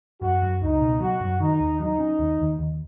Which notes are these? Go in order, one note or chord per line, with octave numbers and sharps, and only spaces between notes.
F#2 F#4
F#2
C#2 D#4
B2
F#3 F#4
F#2
D#3 D#4
D#2
F#3 D#4
C#4
D#2
D#2
D#2